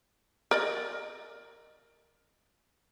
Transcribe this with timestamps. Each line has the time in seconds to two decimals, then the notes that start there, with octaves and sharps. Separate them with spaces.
0.51 A#4 D5 D#5